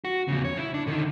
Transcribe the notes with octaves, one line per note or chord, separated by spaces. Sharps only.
F#4
E2 C#3
C#5
E4
D4
D3 D#3